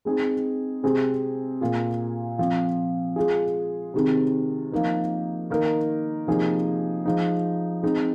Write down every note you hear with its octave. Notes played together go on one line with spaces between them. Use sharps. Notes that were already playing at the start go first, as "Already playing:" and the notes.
G#3 C4 D#4 G#4
C3 G#3 C4 G#4
A#2 A#3 F4 G#4
F3 C4 F4
G#3 F4 G#4
C3 D#3 G#3 C4
F3 A#3 D#4 A#4
D#3 A#3 D#4 A#4
C3 F3 A#3 D#4 G#4
F3 G#3 D#4
G#3 C4 D#4